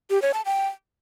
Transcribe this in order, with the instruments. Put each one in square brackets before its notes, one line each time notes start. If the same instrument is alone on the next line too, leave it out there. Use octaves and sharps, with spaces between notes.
[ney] G4
C#5
A5
G5